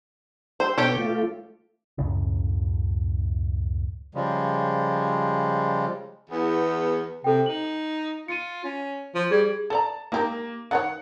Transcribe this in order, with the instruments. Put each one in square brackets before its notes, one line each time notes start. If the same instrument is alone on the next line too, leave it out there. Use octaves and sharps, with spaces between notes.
[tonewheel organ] G4 E6 [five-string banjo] C5
[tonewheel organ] B2 B3 G6 [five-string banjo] G4 A4 C#5
[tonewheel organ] A3 F4
[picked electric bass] C#2 F#2 A2 C#3
[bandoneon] C#3 F3 G3 G#3
[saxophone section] E2 [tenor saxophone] B3
[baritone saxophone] C3 [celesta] A4 G5
[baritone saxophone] D#4 [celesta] F#7
[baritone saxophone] F4 [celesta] C#7 D#7
[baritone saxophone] C#4
F3
[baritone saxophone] G3 [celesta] G#4 G#6
[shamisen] A4 D5 A#5 [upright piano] A5
[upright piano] A#3 [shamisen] D#4 G4 A#4
[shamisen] D#3 D#4 C#5 [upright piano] F#5